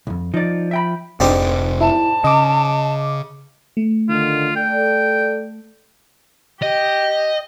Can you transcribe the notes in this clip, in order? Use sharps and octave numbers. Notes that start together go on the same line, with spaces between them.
C2 F2
F3 D#4 D5
E5 G5 B5
F1 G#2 C3 D4 G4
E4 A5
C#3 D#5 D6
A3
D3 D#3 F4
A4 D5 G5
G4 D#5